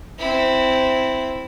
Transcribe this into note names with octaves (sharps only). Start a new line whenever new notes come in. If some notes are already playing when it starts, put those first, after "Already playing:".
C4 E4